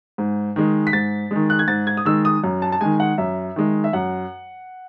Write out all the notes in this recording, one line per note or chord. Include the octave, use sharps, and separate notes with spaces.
G#2
D#3 G#3
B6
G#2 A6
D#3 G#3
F#6
G#6
G#2 A6
G#6
D#6
D#3 G#3 E6
D#6
F#2
A5
A5
D#3 G#3 G#5
F#5
F#2 E5
D#3 G#3
E5
F#2 F#5